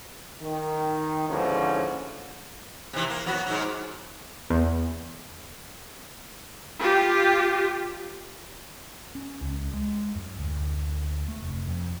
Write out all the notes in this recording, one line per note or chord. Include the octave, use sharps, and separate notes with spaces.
D#3
D#2 G#2 D3 E3 F3 C#4
C3 E3
A#3
F#3 B3 F#4
G#2 F#3
E2
F4 G4
C#4
C#2
G#3
F#2
D2
A3
F1
F2